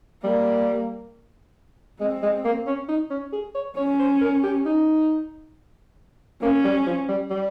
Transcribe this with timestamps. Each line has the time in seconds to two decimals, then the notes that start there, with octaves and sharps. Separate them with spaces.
0.24 G3 A#3
2.00 G#3 C4
2.23 G#3
2.45 A#3
2.67 C#4
2.88 D#4
3.10 C#4
3.33 G#4
3.55 C#5
3.77 C#4 C#5
4.00 C5
4.21 A#4
4.43 G4
4.65 D#4
6.42 A#3 C#4
6.64 G3
6.86 F3
7.09 G3
7.30 G3